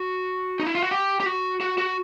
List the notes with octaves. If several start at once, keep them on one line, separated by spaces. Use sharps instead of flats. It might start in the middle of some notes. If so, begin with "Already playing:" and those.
Already playing: F#4
D#4
E4
F4
F#4
G4
G4
F#4
F#4
F#4